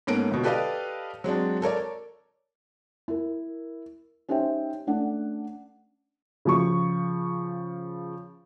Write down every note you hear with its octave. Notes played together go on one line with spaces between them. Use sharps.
G#2 A#3 B3 C#4 A4 D7
G1 B2
G4 A4 B4 D5 D#5 F5
F#3 G#3 C4 D4
A4 A#4 C#5 D5
E4 A#4
C#4 D#4 G4 C5 E5 G5
A3 C#4 D4 F#5
C#3 F3 C#6